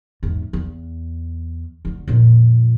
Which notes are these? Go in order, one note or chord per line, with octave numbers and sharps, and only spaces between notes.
E2 G#2
E2
D2 D3
F2 A#2